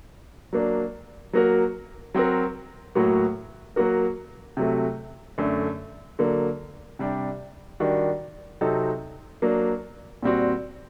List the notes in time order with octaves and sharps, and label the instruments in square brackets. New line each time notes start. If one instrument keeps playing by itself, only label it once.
[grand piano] F#3 A#3 D4
F#3 A#3 F#4 A#4
F#3 C4 F#4 A#4
A2 F#3 A#3 F#4
F#3 A#3 F#4 A#4
C3 F#3 A3
F#2 D3 A3 D4
D3 F#3 A#3
C3 G3 D4 G4
D#3 G3 D4 F#4
C3 F#3 C4 D#4 A4
F#3 A#3 D4
A#2 G3 C4 F#4